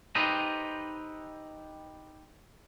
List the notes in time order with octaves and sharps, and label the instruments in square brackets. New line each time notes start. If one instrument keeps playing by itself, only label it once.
[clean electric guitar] D#4 G4 A4 B4 C5 D#5